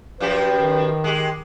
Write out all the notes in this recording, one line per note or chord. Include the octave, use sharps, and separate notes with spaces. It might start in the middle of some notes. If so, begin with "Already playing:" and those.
F#2 F3 G4 B4
D#3
G#3 G4